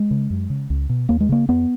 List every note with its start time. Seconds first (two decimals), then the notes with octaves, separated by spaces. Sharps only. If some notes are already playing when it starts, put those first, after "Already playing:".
Already playing: G#3
0.11 C#3
0.30 F#2
0.50 C#3
0.70 C#2
0.89 B2
1.09 D#2 A#3
1.20 G#3
1.29 C#3 A#3
1.49 F2 B3